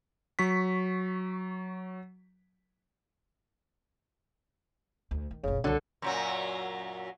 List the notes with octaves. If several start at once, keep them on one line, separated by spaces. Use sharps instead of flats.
F#3 C#6 B6
D2
D#3
F1 A#1 C#3
C2 D3 D#3 F#3 A4
F#2 A#2 F#3